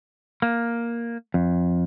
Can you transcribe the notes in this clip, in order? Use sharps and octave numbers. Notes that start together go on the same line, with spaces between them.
A#3
F2